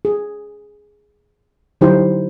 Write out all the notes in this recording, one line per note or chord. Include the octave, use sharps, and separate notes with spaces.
G#4
D3 F#3 D#4 E4 G4 C5